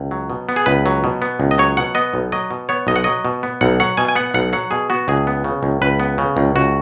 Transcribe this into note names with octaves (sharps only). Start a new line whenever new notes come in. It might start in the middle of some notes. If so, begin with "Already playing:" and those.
Already playing: C#2
F#3
B2
B3
G#4
C#2 B4
F#3
B2
B3
C#2
D#5
F#3 C#5
B2 F#5
B3 D#5
B1
F#3 D#5
B2
B3 C#5
B1 D#5
F#5
F#3 D#5
B2
B3
B1 F#5
F#3 F#5
B2 G#5
G#5
B3 F#5
B1 F#5
F#3 F#5
B2 G#4
B3 F#4
C#2 G#4
B3
C#3
C#2
C#2 B4
B3
C#3
C#2
C#2 F#4